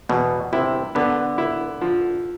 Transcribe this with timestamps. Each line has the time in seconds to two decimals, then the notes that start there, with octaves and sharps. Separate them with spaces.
0.09 E2 B2
0.53 C3 E4
0.95 D3 B3
1.38 E4
1.81 F3